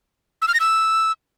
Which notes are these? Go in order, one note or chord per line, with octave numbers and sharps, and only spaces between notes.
E6
F6
A#6
E6